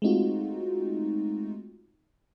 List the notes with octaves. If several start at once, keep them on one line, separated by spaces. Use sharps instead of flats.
G#3 A3 C4 D#4 F4 F#4